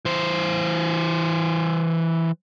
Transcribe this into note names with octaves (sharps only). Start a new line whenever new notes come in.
E3 C5